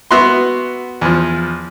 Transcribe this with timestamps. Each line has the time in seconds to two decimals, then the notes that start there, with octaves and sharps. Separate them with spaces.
0.11 B3 F#4 E5 C6
1.01 E2 F3